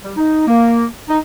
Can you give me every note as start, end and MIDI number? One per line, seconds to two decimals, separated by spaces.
0.04 0.13 55
0.17 0.46 63
0.47 0.85 58
1.09 1.19 63